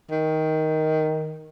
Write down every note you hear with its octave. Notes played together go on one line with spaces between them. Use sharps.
D#3